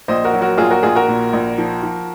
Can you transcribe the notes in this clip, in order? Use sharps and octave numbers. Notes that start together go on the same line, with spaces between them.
A#1 C5 D#5
F#4 A#4
F#3
F#4 A#4
A#1 F4 G#4
F#4 A#4
A#1 F4 G#4
F#4 A#4
A#2
A#1
F3
F3